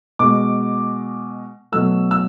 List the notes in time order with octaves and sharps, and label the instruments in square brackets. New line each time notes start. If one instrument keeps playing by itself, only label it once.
[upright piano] B2 G#3 D6
B2 F#3 A3 E6
E6